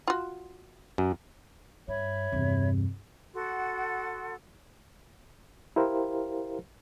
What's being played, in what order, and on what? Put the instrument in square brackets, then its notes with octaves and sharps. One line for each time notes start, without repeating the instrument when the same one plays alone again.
[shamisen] F4 F#4
[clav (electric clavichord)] F#2
[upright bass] G2 [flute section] C#5 E5 B5
[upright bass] E2 G2 [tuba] C3
[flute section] F#4 A4 F#5 C6
[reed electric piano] E4 G4 A#4 C5 F5